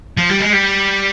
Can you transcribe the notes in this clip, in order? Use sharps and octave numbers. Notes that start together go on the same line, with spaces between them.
F3
G3
G#3
G3